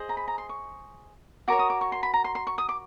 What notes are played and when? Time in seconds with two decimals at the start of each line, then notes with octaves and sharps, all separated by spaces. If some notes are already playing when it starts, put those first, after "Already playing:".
Already playing: G#4 C5 D#5
0.09 A#5
0.17 B5
0.28 A#5
0.38 C6
0.49 C#6
1.48 F#4 A#4 C#5 D6
1.59 D#6
1.70 D6
1.81 C#6
1.92 C6
2.03 B5
2.14 A#5
2.24 C6
2.35 C6
2.47 C#6
2.58 D#6
2.69 D6